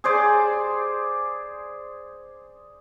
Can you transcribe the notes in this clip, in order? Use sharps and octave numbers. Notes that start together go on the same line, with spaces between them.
G#4 C5 D5